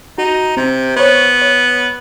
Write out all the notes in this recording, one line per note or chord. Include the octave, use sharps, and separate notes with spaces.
D#4 F#4
C3 C4
B3 C5 C#5
C#5